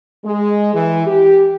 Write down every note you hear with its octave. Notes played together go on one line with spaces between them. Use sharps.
G#3
E3
G4